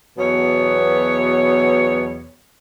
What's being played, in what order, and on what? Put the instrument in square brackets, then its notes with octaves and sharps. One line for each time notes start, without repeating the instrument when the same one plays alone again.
[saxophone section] E2 B2 F#3 B3 C#5